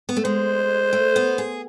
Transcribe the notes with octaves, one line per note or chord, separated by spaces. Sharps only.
B3
A3
G#3 C5
A3
B3
G#4